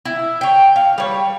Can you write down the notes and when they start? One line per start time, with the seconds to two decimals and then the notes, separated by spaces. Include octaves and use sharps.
0.05 E4
0.41 C#5 G5
0.76 F5
0.98 G3 C#5